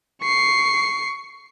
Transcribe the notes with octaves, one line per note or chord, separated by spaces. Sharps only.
C#6 C7